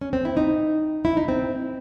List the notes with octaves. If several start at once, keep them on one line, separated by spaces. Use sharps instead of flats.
C#4
C4
E4
D#4
E4
D#4
C4